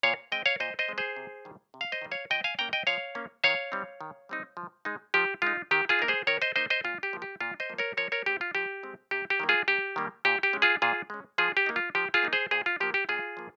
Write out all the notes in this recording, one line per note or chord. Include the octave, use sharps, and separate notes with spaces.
A#2 C#5 F5
G#3 C4 D#5 G5
C#5 F5
A#2 C5 D#5
C5 D#5
G#3 C4
G#4 C5
C3
D#3 G3
C3
F5
C5 D#5
D#3 G3
C#5 F5
F3 D#5 G5
F5 G#5
A#3 C#4 G5 A#5
D#5 G5
F3 C#5 F5
A#3 C#4
D#3 C#5 F5
G3 C4 D#4
D#3
G3 C4 D#4
F3
G#3 D#4
F3 G4
G#3 D#4 F4
D#3 G4
F4 G#4
A#3 D#4 A#4
G#4 C5
D#3 A#4 C#5
C5 D#5
A#3 D#4 C5 D#5
C5 D#5
A#2 F4
G4
F3 A#3
G4
A#2 F4
C5 D#5
F3 A#3
A#4 C#5
F3 A#4 C#5
A#4 C#5
G#3 C4 G4
F4
F3 G4
G#3 C4
C3 G4
G4
D#3 G3 A#3
F4 G#4
C3 G4
D#3 G3 A#3
A#2 G4
G4
G#3 C#4
F4 G#4
A#2 F4 G#4
G#3 C#4
F3 F4 G#4
G4
A#3 D#4
F4
F3 G4
F4 G#4
A#3 D#4
G#4 C5
A#2 G#4 C5
F4
F3 A#3 G4
G4
A#2 F4 G#4
F3 A#3